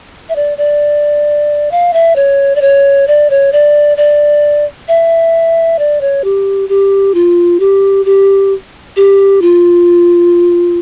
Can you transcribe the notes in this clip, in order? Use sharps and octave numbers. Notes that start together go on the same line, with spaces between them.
E5
D5
D5
F5
E5
C#5
D5
C#5
D5
C#5
D5
D5
E5
D5
C#5
G4
G4
F4
G4
G4
G4
F4